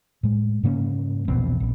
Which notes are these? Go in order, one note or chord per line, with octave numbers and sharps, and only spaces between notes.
A2 G#3
G#2 C#3 A#3 C#4
A#1 E2 B2 C4
A#1